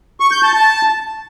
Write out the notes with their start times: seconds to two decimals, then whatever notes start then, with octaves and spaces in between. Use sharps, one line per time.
0.20 C#6
0.31 G6
0.42 A5
0.54 A5